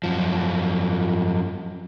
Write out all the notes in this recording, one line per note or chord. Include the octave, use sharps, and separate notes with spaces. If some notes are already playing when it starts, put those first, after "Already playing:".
F#2 F3